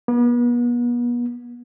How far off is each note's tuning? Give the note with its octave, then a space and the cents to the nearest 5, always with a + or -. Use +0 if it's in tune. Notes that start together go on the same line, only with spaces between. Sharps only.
B3 -40